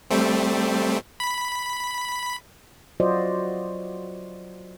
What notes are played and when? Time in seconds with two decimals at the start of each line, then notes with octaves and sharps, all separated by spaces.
0.10 G3 A3 C4
1.20 B5
3.00 F#3 F4 F#4 C5 D5 D#5